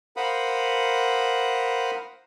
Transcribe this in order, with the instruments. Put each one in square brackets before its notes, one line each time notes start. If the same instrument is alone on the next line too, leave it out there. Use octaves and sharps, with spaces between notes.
[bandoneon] A#4 C5 F5 F#5 B5 D#6